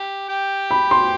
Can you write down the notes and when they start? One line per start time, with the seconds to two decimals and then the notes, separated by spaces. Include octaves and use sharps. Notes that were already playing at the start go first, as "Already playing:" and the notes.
Already playing: G4
0.29 G4 G5
0.71 B5
0.91 C6